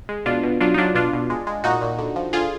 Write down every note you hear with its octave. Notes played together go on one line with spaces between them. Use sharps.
G#3
B2 D4 F4
B2
F#3 D4 F4
D#4
F#3 D4 F4
B2 D4 F4
B2
G#3
G#3
A#2 D#4 F#4
A#2
D3
F3
D3 F4 G#4